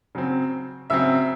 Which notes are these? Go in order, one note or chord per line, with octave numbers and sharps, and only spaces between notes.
C#3 F#3 C4
C#3 F#3 C4 E5 E6